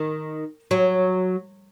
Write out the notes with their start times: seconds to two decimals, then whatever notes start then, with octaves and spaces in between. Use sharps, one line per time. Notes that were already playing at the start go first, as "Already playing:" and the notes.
Already playing: D#3
0.71 F#3